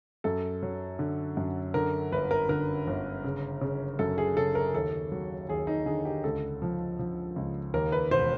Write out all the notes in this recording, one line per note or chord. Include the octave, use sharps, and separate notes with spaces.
F#2 A4
F#3
D3
F#2
D3 A#4
G1 B4
A#4
D3 A#4
G1
C#3
C#3
F#2 A4
G#4
C#3 A4
A#4
D#2 A4
F#3
D#2 G#4
D#4
D3 G#4
G4
C#2 A4
F3
F3
C#2
D#2 A#4
B4
E1 C5